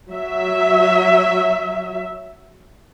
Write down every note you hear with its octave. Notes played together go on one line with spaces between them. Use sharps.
F#3 E5